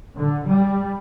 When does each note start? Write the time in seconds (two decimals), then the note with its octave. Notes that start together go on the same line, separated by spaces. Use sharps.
0.17 D3
0.47 G3